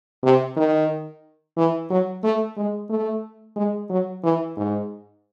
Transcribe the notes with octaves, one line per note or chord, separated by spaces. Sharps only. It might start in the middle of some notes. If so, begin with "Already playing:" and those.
C3
D#3
E3
F#3
A3
G#3
A3
G#3
F#3
E3
G#2